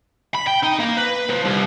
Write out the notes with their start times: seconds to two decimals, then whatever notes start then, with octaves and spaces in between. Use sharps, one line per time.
0.35 B5
0.48 G5
0.64 D#4
0.80 A#3
0.98 B4
1.30 F3
1.46 C2